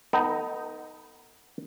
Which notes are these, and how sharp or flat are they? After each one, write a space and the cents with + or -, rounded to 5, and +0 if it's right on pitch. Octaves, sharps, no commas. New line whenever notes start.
B3 +0 D#4 +0 A4 +45